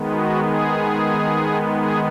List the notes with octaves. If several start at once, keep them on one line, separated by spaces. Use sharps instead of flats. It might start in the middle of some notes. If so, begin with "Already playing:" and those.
Already playing: D#3 G#3 B3
F#4
G#4
G#4